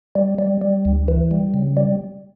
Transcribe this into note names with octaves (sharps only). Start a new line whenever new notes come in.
G3
G3
G3
D2
E3
G3
C#3
G3